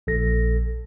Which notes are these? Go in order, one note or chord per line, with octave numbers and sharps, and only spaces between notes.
A#1 A4 A#6